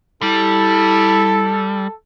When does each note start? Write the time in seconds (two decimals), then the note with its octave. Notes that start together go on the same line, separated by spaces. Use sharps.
0.22 G3 E4 A4